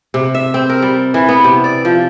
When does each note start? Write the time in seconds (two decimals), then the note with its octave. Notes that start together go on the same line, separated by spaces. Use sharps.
0.14 C3
0.35 E5
0.54 C4
0.69 A#4
0.82 G3
1.14 E3
1.29 B3
1.44 C3
1.64 D5
1.85 F3